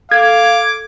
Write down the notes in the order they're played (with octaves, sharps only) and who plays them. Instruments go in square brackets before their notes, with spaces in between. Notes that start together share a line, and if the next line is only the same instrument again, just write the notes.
[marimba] A4 [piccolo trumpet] F5 [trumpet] D6 [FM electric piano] G#6